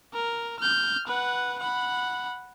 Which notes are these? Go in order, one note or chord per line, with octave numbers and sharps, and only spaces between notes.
A#4
F6 G6
B4 F#5
F#5 B5